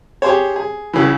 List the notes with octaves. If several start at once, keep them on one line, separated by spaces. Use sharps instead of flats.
G4 G#4 C5 C#5
G#4
C#2 C#3 E3